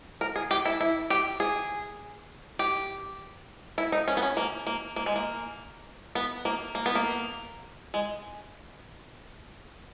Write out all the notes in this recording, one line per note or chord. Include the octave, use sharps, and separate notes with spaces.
A#4
G#4
G4
E4
E4
G4
G#4
G4
E4
D#4
C#4
B3
C#4
A#3
A#3
A#3
G#3
A#3
B3
A#3
A#3
B3
A#3
G#3